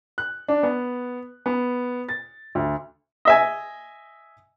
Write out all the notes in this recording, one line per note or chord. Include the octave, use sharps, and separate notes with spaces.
F#6
D4
B3
B3
A6
D2
D#5 E5 G#5